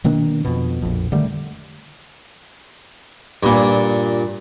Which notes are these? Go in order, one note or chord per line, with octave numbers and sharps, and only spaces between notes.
B2 D#3 A#3 D4
F2 B2
A#1 F2
D3 D#3 G3 A3
G2 A#2